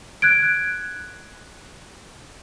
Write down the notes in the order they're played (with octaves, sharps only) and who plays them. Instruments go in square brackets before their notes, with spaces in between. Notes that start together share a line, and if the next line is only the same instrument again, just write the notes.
[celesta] F#6 G#6 D7